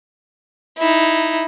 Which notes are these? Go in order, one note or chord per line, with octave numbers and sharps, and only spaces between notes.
D#4 E4